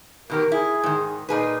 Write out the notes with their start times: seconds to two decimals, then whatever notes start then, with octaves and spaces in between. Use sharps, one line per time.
0.30 B2 D#3 G4 A#4
0.52 E4 G#4
0.83 G#2 D#3
1.29 A#2 D#4 G#4 B4